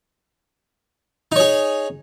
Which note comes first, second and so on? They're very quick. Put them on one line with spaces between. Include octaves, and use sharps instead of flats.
D#4 C#5 G#4